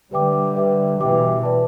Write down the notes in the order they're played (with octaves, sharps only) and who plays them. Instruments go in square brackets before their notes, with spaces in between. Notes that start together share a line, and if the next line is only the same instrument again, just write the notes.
[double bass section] D3 G3 [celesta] G4 B4 E5 G5 D6
[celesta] G4 B4 E5 G5 D6
[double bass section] B2 E3 [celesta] G4 B4 E5 G5 D6
[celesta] B4 D5 A5